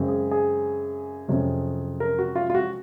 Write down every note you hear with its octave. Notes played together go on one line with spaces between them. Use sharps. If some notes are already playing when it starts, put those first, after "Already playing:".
Already playing: F#2 C#3 G#3 C4
G#4
G#4
F2 C3 F#3 C#4
A#4
F#4
F4
F4
F#4